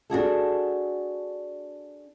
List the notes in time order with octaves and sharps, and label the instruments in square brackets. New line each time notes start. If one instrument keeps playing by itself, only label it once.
[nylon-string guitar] D4 F#4 G#4 A4